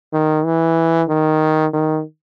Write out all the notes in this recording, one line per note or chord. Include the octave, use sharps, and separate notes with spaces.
D#3
E3
D#3
D#3